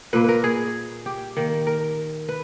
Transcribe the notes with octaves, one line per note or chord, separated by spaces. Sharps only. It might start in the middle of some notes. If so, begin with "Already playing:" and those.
A#2 A#3 B4
A#4 B4
G#4
G4
D#3 A#3
A#4
B4